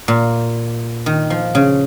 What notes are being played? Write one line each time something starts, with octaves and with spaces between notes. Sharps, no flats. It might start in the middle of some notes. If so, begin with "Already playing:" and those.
A#2
D#3
F3
C#3